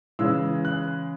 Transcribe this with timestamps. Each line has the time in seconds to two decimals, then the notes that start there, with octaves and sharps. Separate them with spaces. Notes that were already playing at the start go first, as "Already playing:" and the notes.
0.19 C#3 E3 G#3 E6
0.65 F#6